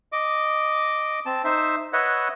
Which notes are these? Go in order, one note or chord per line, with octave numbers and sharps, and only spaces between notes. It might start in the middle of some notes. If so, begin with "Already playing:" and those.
D#5 D6
C4 A5
D#4 C5 E5
B4 C#5 D#5 E5 F#5